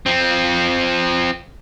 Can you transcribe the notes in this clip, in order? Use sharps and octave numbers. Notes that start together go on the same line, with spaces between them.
F3 C4